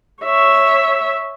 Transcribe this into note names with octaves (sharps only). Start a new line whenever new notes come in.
C#5 E5